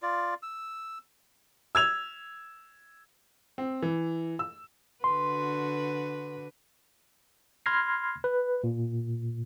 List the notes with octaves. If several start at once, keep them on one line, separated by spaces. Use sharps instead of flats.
F4 D5
E6
E6 G#6 F7
C4
E3
E6
D3 F#4 B4 C6
B5 C6 F6 G#6 A#6 C7
B4
A#2